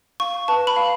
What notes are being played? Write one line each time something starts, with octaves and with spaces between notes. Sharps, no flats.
F5 C#6
B4 A5
B5
F5